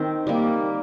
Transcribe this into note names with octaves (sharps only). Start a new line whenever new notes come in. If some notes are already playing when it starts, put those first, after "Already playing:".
Already playing: D#3 C4
G3 A#3